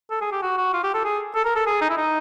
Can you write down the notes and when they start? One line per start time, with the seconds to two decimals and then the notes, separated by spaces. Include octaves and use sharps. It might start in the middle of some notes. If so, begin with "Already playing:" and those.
0.11 A4
0.21 G#4
0.32 G4
0.42 F#4
0.57 F#4
0.73 F4
0.84 G4
0.94 A4
1.05 G#4
1.35 A4
1.45 A#4
1.56 A4
1.66 G#4
1.81 D#4
1.90 E4
1.97 D#4